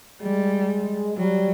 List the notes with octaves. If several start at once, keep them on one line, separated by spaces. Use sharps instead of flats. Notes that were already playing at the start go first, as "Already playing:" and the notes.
G3 G#3
F#3 G3